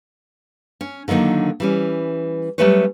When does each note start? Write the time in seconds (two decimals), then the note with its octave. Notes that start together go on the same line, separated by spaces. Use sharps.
0.81 C#4
1.08 D3 D#3 F#3 A#3 D#4
1.60 E3 G3 C#4
2.58 F#3 G3 A3 C#4 B4 C#5